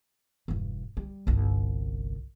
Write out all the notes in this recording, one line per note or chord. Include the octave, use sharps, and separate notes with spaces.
E1 G2
G3
G1 C2